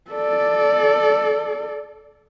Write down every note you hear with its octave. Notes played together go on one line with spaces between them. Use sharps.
A4 D5